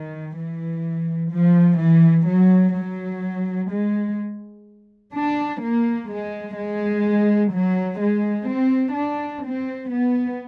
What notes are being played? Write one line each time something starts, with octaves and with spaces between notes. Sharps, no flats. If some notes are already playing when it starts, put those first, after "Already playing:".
Already playing: D#3
E3
F3
E3
F#3
F#3
G#3
D4
A#3
G#3
G#3
F#3
G#3
C4
D4
C4
B3